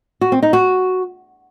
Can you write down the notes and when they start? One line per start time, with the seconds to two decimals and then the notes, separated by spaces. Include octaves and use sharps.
0.21 F#4
0.32 C4
0.43 D#4
0.53 F#4